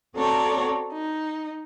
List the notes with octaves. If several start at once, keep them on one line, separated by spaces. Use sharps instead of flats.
C4 F#4 A4 C#5 D5 A#5
D#4